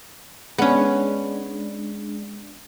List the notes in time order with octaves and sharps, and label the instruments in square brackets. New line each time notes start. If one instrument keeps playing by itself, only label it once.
[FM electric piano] G#3 D4 [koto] B3 C#4